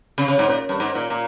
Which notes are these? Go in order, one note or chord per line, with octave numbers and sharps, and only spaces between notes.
C#3
C#3
G#2
A#2
G2
G#2
A#2
A#2